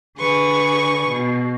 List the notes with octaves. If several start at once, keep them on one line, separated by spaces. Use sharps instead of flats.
D3 G#4 B4 C#6
B2